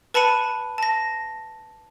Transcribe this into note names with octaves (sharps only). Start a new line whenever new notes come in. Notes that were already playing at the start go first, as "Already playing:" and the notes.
B4 A5 B5 C#7 D#7
A5 A#6